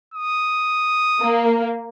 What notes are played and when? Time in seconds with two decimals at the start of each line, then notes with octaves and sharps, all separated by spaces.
0.14 D#6
1.21 A#3